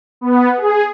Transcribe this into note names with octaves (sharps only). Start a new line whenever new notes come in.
B3
G#4